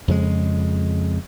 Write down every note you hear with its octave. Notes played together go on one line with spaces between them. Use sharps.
F2 C#3 G#3